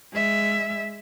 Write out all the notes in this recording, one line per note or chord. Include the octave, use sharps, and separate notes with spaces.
G#3 E5